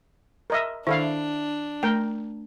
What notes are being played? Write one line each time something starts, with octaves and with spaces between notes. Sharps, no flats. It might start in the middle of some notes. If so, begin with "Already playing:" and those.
A#4 D#5 E5
D#3 D4 E4 A4 F5
A3 A#4 G5